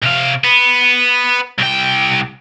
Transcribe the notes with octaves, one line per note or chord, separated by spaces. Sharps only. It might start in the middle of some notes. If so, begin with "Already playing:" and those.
C3 F5
B3
C2 G5